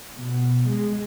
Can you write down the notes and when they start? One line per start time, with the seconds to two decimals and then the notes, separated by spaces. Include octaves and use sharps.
0.16 B2
0.70 G#3